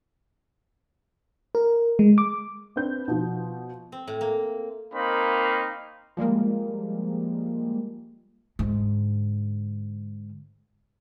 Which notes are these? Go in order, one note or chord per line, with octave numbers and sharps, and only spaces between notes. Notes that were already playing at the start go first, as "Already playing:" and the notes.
A#4
G#3
D6
C4 D4 B4 G6
B2 F3
C4
A2
A#3
A#3 C4 D#4 F5 B5
F3 G3 G#3 A#3
G#2 D3